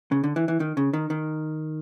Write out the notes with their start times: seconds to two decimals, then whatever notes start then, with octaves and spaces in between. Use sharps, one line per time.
0.12 C#3
0.24 D3
0.36 E3
0.48 E3
0.60 D#3
0.77 C#3
0.93 D#3
1.10 D#3